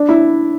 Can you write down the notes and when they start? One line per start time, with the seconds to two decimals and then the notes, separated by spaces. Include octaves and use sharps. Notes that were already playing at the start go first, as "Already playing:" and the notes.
Already playing: D4
0.09 E4